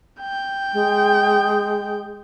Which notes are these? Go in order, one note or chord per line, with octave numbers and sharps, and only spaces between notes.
G5
G#3